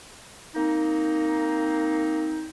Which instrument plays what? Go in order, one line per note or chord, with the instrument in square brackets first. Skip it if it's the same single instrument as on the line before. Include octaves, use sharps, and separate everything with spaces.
[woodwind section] A#3 C4 D#4